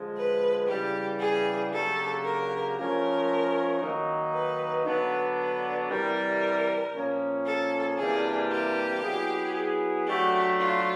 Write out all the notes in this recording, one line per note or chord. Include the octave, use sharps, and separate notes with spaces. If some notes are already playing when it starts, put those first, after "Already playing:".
Already playing: D3 F3 G#3
B4
C#3 E3 G3 G4
G#4
C#3 F#3 A#3 D4 G4 A4
A#4
F3 A3 C#4 A#4
D#3 F#3 A#3 D#4
B4
D3 F#3 B3 D4 B4
B4
C3 E3 G3 A#4
A#2 F3 A#3 C#4
A4
C3 E3 G3 A#3 D4 G#4
G4
F#3 B3 E4 G#4
F#3 A3 D4 F#4 G4
F4